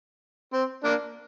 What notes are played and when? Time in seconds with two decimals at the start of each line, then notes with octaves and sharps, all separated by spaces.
0.53 C4
0.84 A#3 D4